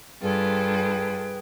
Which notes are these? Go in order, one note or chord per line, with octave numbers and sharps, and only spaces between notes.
G2 F4 G#4 A4 B4 G5